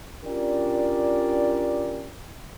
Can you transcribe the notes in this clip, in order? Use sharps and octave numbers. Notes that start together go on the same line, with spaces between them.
C#4 D4 F4 G4 A#4 D5